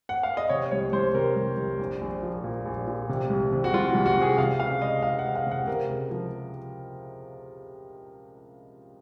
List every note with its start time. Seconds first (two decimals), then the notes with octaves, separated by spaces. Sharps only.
0.09 F#5
0.23 F5
0.37 D#5
0.49 C3 C#5
0.71 C2 C#5
0.93 C2 C5
1.14 C3 A#4
1.36 C2
1.57 C2
1.79 A#1
2.01 A#1
2.23 F3
2.44 A#2
2.65 A#1
2.87 A#2
3.09 C3
3.30 C2
3.52 C3
3.64 F#4
3.74 C2 F4
3.90 C2 F#4
4.06 F#4
4.17 C3 G#4
4.38 C3 F5
4.60 C#2 F5
4.82 C#2 D#5
5.03 C#2 F5
5.19 F#5
5.24 C#2
5.35 F5
5.46 C3 F#5
5.68 C3 A#4
5.89 C#2
6.11 F3